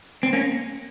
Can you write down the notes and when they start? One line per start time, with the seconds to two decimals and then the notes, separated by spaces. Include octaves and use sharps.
0.23 C4
0.33 A#3 C#4